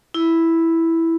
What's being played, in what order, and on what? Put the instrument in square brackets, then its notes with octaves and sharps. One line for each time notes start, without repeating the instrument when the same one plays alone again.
[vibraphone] E4